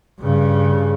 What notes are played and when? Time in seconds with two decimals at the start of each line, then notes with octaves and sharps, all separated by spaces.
0.19 G2 C#3